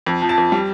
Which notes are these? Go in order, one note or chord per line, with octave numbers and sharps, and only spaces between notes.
F2
F3
A5
F2
G3